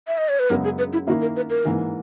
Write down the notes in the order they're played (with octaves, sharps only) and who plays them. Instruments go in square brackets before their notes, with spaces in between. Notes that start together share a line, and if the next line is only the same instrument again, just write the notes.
[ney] E5
D#5
C#5
B4
[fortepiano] F#2 C#3 G#3 B3 [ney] A#4
[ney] G#4
B4
E4
[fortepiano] D#3 A#3 E4 [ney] F#4
[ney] A#4
B4
A#4
[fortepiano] G#2 E3 A#3